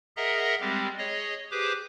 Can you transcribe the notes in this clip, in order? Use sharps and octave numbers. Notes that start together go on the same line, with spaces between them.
G#4 A#4 D#5 E5 F#5 A#5
G3 G#3 C4 G4
G#4 C#5 D#5
G4 G#4 B4 C5 D6